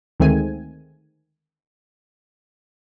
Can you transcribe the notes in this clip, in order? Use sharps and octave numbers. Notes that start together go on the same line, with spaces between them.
D2 D#3 G#3 A3 C4 G#5